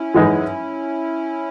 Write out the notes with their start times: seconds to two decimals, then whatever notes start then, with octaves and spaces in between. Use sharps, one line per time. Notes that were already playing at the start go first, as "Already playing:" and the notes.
Already playing: C#4 E4
0.14 F#2 E3 G#3 D#4